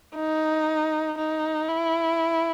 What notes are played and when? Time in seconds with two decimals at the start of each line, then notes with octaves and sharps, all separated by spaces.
0.15 D#4
1.17 D#4
1.68 E4